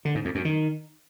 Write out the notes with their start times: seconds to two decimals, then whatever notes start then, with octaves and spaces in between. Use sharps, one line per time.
0.05 D3
0.15 G#2
0.25 F2
0.35 F#2
0.45 D#3